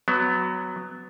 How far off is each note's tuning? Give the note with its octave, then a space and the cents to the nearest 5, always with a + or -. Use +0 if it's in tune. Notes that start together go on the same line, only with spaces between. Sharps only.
F#3 +0 B3 +15